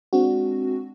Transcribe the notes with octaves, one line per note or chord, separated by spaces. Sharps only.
G#3 C4 D4 F#4